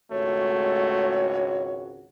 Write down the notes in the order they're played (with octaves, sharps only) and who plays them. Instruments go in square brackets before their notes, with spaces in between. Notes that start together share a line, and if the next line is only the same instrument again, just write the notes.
[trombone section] G#1 C#2 F#4 [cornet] A3 [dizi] C#5